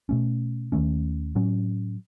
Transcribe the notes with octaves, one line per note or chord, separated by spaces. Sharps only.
B2 A3 C#4
D#2 D#3 A3 C#4
A2 F#3 C#4